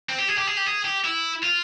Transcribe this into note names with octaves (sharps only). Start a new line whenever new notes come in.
C4
G4
G#4
G4
G#4
G4
G#4
G4
E4
F4